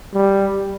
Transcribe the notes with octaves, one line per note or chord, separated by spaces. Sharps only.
G3